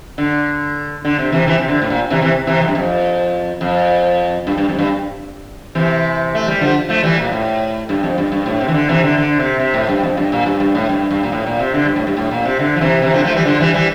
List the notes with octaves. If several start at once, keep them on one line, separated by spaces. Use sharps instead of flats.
D3
D3
C3
C3 E3
C3 E3
C3
D3
A2
A#2
C3 E3
C3 E3
C3 E3
F2
G2
F2
F2
G2
G2
F2
G2
C3 E3
A3
G3
D3 F3
F3 A3
E3 G3
A#2
A2
G2
F2
G2
G2
A2
C3
E3
D3
C3 E3
D3
D3
C3
C3
A2
G2
F2
G2
A#2
G2
G2
A2
G2
G2
A#2
A2
A#2
C3
D3
G2
A2
G2
A2
A#2
C3
D3
F3
C3 E3
C3 E3
D3 F3
F3 A3
E3 G3
D3 F3
E3 G3
E3 G3